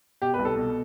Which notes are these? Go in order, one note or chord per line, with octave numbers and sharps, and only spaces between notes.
B2 G4
B4
C2
A4
B2